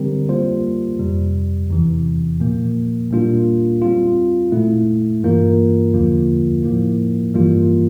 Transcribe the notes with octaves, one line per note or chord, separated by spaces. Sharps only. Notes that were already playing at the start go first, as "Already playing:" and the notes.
Already playing: D3 G3 C4 G4 A#4
G3 A#3 F4 C5
F2 C3 G3
E2 C3 E3
A#2 F3 A#3
A#2 G3 A#3 D4 F4
G3 C4 F4
A#2 A3 E4
G2 E3 A#3 F4 A#4
E2 D3 F3 A#3 F4
A2 F3 A#3 E4
G2 E3 G3 A#3 F4